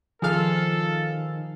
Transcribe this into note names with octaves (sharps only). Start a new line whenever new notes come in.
D#3 F3 G#4 A4 F5 F6